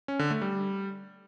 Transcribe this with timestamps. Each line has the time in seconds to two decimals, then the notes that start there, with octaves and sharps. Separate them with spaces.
0.08 C#4
0.19 D3
0.30 A3
0.42 G3